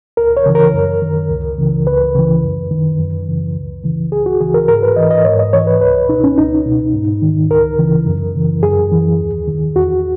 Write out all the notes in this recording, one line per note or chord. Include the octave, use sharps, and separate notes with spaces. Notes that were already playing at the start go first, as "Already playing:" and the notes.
C#2 A#4
C#5
C#3 E3
A#4
F#2
D#3
C#2
C#3 E3
C#2 B4
C#3 E3
F#2
D#3
F#2
C#3 E3
C#2
C#3 E3
C#2 G#4
F#4
C#3 E3 G#4
A#4
G#2 A#4
B4
E3 D#5
D#5
G#2 C#5
D#5
E3 C#5
B4
C#2 B4
B2 D#4
C#4
C#2 D#4
B2
G#2
D#3
C#2 A#4
C#3 E3
F#2
C#3 E3
F#2 G#4
E3
D#2
D#3
E2 F#4